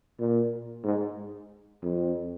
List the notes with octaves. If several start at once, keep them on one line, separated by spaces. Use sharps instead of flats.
A#2
G#2
F2